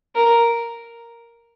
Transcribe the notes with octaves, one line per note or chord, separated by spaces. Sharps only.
A#4